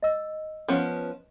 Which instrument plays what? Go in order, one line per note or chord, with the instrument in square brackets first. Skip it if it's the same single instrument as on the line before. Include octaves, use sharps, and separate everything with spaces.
[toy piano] D#5 E6
[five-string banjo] F3 B3 C#4